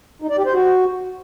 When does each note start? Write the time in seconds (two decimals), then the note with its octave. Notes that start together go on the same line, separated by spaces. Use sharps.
0.22 D#4
0.30 D5
0.38 G4
0.46 C5
0.54 F#4